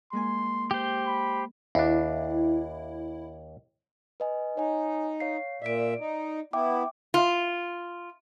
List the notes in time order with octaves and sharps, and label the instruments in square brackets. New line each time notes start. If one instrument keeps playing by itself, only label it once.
[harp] G#3 A#3 G#5 [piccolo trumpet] C6
[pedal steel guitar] G4 C5
[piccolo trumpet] B5
[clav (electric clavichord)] D#2 D4 [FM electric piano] E4
[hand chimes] B4 D#5 G#5
[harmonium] D#4 [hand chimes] C#5 D#5 G#5
[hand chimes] C#5 F5 C7
[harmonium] A#2 E5 [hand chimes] D5 D7
[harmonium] D#4
[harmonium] B3 E4 [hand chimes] E5 G5 D6
[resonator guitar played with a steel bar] F4